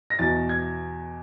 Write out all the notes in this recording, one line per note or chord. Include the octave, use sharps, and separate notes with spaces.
A#6
E2 B2 A6
G#6